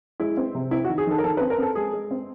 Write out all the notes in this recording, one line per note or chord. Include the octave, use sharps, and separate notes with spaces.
G#3 E4
C4
C3
C4 E4
F#4
D#3
G#4
D#3 A4
A#4
D#3 A4
B4
C4
A#4
C4 A4
G#3 G#4
G#3
C4